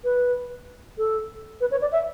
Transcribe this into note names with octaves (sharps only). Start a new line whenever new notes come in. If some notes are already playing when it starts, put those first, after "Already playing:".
B4
A4
B4
C#5
D5
E5